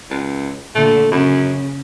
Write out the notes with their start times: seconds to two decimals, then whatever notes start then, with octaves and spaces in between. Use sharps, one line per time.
0.10 C#2
0.75 A#2 D3 A3
1.12 F#2 C#3